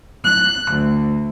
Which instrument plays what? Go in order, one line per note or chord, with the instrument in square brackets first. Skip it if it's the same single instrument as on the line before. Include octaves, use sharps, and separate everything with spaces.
[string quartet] F#6
D2